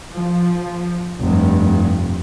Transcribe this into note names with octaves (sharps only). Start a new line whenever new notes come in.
F3
F1 G2